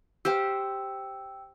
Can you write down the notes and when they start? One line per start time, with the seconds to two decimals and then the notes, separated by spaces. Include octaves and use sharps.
0.25 G4 C5 F5 G5 E6